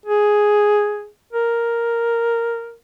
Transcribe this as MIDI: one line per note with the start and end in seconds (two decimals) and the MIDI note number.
0.06 1.08 68
1.33 2.75 70